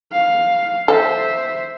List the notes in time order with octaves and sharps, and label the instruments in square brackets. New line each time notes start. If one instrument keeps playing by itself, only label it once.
[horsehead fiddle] F5
[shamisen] A4 [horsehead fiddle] C5 E5